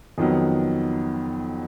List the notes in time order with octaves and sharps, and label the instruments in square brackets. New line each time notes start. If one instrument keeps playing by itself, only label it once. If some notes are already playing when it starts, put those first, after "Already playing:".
[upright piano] F2 D#3 F#3 B3